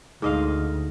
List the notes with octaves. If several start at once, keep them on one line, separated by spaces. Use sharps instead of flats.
D2 G#2 D#5 F5